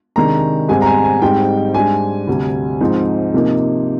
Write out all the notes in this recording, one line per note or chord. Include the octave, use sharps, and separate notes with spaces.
C3 D#3 G#3 D4 A#5
G#2 G3 C4 G#5
A#5
G#5
G#5
G#2 G3 C4 D#4 G5
G#2 G3 D4 G#5
D2 C3 G3
G#2 F3 C4 D#4
C3 F3 A#3 D#4